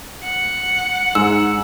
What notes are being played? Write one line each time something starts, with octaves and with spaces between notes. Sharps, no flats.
F#5
G#2 E6